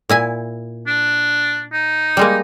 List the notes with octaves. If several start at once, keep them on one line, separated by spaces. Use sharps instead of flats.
A#2 E4 G#5
D4
D#4
G3 G#3 A#3